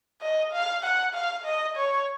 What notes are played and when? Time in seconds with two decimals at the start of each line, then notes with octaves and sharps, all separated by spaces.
0.21 D#5
0.52 F5
0.84 F#5
1.14 F5
1.45 D#5
1.76 C#5